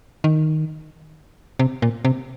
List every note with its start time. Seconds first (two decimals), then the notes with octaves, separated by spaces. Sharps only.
0.24 D#3
1.59 C3
1.82 A#2
2.05 C3